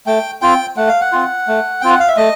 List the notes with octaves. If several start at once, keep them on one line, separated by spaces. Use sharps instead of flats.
A3 G5
C4 F4 G5
A3 F#5
F5
F#5
C4 F4
A3
C4 F4 G5
F#5
F5
E5
A3 D#5